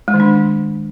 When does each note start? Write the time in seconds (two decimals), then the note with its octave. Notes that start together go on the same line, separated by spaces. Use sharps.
0.08 G#3
0.14 D#3
0.20 D4